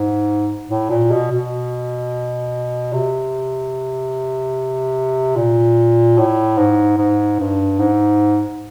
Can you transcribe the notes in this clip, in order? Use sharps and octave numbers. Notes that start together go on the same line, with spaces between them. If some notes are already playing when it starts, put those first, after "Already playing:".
Already playing: G#2
A2
A#2
B2
B2
C3
A#2
A2
G#2
G#2
G2
G#2